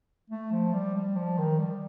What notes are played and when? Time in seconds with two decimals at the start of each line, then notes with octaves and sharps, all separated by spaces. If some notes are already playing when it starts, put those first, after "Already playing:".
0.30 A3
0.52 F3
0.74 G3
0.95 G3
1.16 F3
1.38 D#3
1.59 G3